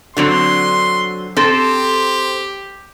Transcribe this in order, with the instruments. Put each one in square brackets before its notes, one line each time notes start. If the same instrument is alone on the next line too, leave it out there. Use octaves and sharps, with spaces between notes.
[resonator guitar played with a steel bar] D3 F#3 C4 [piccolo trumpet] C6
[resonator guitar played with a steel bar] C4 A4 C5 [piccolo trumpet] G4